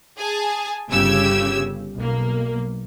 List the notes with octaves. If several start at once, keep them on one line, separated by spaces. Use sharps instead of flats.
G#4 G#5 A5
G1 C#3 G4 E6 G#6
B1 A#3